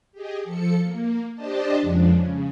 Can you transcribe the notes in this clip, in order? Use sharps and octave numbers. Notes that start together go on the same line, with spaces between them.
G4 G#4 D#5
F3 A4 C#7
A#3
D4 G4 C5 D5 D#5 A5
F2 C#3 F3 G#3 D4
C#3